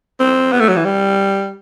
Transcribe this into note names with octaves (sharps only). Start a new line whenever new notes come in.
C4
B3
A3
F#3
E3
G3